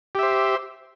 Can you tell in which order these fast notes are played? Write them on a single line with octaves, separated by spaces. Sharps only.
G4 E5 C5